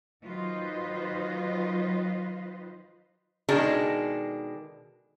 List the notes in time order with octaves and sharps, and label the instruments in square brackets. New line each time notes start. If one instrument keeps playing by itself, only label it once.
[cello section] D#3 F#3 F4 B4 C5 D#5
[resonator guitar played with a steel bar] B2 D#3 G#3 D4 A4 A#4